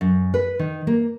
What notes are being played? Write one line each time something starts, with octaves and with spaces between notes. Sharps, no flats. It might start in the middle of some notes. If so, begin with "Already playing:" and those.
F#2
B4
D#3
A#3